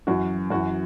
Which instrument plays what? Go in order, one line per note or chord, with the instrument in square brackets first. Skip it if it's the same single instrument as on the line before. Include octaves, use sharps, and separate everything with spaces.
[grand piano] F#2 E3 F#4
F#2 E3 F#4